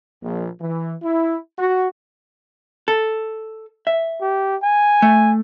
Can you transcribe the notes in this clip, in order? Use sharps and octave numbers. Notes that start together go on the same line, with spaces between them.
A#1
E3
E4
F#4
A4
E5
G4
G#5
A3